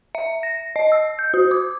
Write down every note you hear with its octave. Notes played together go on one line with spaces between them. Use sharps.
E5
A#6
D#5
E6
G6
F#4
D6